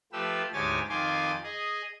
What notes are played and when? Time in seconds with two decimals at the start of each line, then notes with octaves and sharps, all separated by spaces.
0.12 F3 A3 F4 G4 B4 E6
0.53 D2 G#2 G4 C#5 G#5 A6
0.89 F2 D#3 F4 G#5 C6 D6
1.43 G#4 D#5